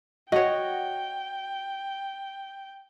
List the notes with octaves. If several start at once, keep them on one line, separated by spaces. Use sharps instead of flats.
F#4 C#5 D#5 G5